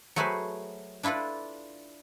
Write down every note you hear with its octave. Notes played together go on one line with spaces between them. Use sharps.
F#3 A3 F#4 G#4 B4 C5
D4 E4 F4 A4 B4